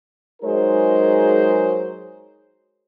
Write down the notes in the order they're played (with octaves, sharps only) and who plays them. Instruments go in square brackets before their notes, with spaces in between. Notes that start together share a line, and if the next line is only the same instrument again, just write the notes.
[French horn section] F#3 G#3 D#4 G#4 A#4 C5